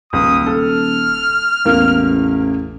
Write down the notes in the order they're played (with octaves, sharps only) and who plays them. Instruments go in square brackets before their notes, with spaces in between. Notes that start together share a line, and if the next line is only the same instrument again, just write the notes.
[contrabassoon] D#1 [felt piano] C#2 [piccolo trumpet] D#6
[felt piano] A4 [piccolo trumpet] F6
[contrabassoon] A1 [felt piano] E2 A#3